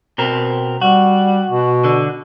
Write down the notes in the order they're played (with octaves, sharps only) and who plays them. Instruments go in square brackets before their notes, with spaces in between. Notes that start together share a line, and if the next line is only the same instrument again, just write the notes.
[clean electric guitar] B2 C4 A#4
[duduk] G3 [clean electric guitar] F#4
[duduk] B2
[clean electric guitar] D3